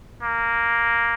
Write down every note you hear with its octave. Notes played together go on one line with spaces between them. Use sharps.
A#3